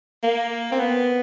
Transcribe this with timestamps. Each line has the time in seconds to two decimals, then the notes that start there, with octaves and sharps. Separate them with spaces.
0.23 A#3
0.72 C4
0.79 B3